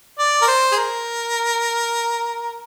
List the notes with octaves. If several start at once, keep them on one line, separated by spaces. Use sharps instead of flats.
D5
A#4
C5
G#4
A#4